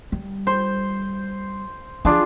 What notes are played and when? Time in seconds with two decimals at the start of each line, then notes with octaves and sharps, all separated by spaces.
0.12 G3
0.47 C5
2.05 F3 D4 F4 G#4